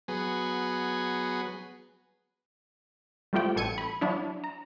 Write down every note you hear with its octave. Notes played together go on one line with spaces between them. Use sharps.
F#3 B3 G#4
G3 A3 C4 F4 G4 G5
A1 A4 G#6 C#7 D#7
B5
F#3 D4 E4
A#5